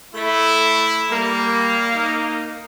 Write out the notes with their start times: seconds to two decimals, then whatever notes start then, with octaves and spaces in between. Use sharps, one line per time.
0.14 A3 E4
1.11 G3 A#3
1.94 D#4